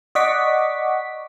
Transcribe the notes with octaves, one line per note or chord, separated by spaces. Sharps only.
D5 D#5 F#5 C#6 D6 B6